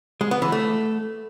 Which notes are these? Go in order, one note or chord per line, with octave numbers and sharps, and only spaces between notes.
G#3
B3
E3
A3